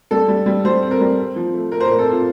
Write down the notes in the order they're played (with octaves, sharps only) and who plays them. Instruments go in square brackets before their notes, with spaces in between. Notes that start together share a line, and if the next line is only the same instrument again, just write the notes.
[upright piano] G3 A4
G3
G3
G3 C5
C4
A#4
G3
C4
F3
A3
A3 A#4
C5
A#4
A#2
A4
C4 F4